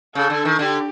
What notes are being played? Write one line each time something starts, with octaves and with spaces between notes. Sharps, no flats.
C#3 A4
D3
D#3
D3 G4